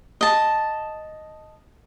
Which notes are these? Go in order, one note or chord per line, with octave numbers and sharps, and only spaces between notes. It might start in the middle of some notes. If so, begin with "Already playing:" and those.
D#5 A5